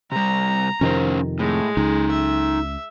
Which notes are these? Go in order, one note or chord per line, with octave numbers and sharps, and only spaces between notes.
C3 G3 A#5
F2 C3 D#3 C#4 A#4 C5
A2 G#3
C#2 D#4 A4
E5